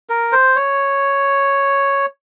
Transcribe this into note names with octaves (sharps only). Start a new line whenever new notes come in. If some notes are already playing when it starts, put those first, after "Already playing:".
A#4
C5
C#5